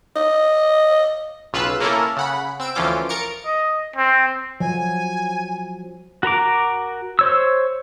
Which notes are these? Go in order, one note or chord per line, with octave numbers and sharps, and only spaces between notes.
D#5
B1 C#3 F4 B4 E6 F#6
A#3 C#4 E4 A4 A#4
C#3 F#5 B5
C4 E6 D7
D2 E3 F3 C#4 F4 D6
A#4 A6 C#7 D7
D#5
C4
F3 F#3 G#5
F#4 A#4 A#5 D6
C5 C#5 E6